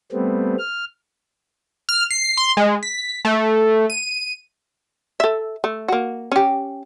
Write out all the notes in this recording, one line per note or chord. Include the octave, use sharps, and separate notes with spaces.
G3 A3 B3 C4
F6
F6
C7
C6
G#3
B6
A3
D#7
A4 E5
A3
A#3 F#4
C#4 G4